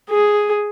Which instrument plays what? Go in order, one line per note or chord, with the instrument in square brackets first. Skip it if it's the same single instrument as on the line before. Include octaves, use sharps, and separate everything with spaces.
[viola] G#4